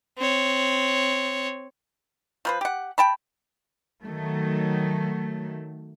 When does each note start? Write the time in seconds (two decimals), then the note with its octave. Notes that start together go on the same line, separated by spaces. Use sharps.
0.18 C4 C#5
2.45 F3 B4 C5
2.61 G4 F#5
2.98 G5 A5 B5
4.02 D#3 F#3 A3